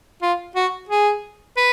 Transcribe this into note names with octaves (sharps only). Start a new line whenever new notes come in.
F4
F#4
G#4
B4